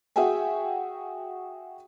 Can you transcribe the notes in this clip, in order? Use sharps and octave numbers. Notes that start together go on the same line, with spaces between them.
F#4 G#4 E5 G5 G#5